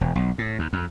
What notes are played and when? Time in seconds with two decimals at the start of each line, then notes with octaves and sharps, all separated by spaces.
0.01 E1
0.15 B1
0.38 A2
0.59 D#2
0.73 F2